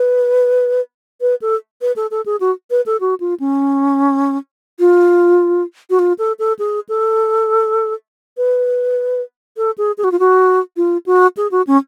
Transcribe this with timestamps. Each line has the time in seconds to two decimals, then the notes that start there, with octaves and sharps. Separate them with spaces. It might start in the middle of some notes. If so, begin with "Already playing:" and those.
Already playing: B4
1.21 B4
1.42 A4
1.81 B4
1.96 A4
2.11 A4
2.26 G#4
2.40 F#4
2.70 B4
2.86 A4
3.01 F#4
3.20 F4
3.40 C#4
4.79 F4
5.90 F#4
5.99 F4
6.18 A4
6.39 A4
6.59 G#4
6.89 A4
8.37 B4
9.57 A4
9.78 G#4
9.98 G#4
10.04 F#4
10.12 F4
10.19 F#4
10.77 F4
11.06 F#4
11.37 G#4
11.51 F#4
11.67 C#4